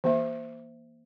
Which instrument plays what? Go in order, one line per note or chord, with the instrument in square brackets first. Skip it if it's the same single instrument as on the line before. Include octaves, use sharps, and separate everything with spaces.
[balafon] E3 A#3 E5